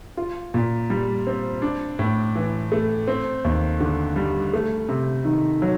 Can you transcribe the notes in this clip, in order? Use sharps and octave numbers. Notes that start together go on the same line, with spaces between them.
F4
A#2
G3
C4
D4
A2
E3
A3
C4
D#2
D3
G3
A3
C3
D#3
F#3